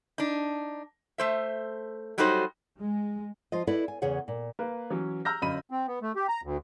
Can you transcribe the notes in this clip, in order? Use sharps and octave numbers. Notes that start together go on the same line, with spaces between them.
D4 D#4
A3 C5 E5
F#3 G3 D#4 F#4 A4 C5
G#3
F3 F4 D#5
E4 A4 B4 D5 D#5
G#5
E2 C#3 G#4 C#5 F#5
A#2
A#3 B4
E3 F#3 C#4
A#5 E6 F6 G6 A#6
G1 F#2 D#5 B5 D#7
C4
B3
A3
G4
A#5
D2